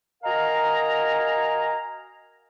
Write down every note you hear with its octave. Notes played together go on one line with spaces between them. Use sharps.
F#4 A#4 D#5 F5 G#5 A#5